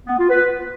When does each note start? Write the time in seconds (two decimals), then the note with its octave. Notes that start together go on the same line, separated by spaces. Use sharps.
0.06 B3
0.18 F4
0.29 B4